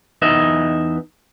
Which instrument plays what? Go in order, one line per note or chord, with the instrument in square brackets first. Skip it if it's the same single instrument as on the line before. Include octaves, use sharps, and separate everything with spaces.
[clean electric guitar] E2 D#4 B4 D#5 E5